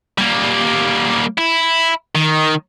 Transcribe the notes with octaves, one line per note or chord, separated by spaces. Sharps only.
G3 A#3
E4
D#3